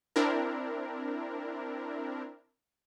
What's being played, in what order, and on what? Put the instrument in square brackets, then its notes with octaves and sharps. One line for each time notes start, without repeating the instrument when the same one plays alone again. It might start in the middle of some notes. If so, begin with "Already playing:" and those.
[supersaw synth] C4 D4 E4 A#4